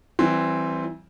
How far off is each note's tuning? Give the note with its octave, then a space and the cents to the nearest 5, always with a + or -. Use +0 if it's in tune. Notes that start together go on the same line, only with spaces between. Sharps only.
E3 +0 G3 -30 C4 +0